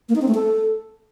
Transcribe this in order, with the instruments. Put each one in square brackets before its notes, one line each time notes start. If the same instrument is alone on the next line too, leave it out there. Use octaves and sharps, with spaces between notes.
[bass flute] A#3
D#4
C4
A3
A4